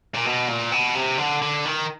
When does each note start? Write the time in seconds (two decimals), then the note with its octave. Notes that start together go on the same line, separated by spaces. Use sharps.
0.15 A#2
0.25 B2
0.48 A#2
0.72 B2
0.95 C3
1.18 D3
1.42 D3
1.65 D#3